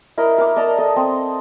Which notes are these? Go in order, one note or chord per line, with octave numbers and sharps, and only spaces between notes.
E4 A#4 D#5 B5
A#4 D6
D5 D#5 A5 A#5
A4 D#5
C4